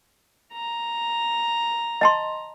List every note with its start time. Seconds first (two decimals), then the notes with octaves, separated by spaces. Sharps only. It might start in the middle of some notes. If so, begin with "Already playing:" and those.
0.53 A#5
2.01 D#5 A5 C6